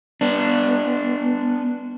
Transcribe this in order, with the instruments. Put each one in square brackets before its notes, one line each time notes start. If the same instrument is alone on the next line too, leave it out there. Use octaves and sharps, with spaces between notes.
[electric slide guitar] B3 D4